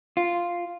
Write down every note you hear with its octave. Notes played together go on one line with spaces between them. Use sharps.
F4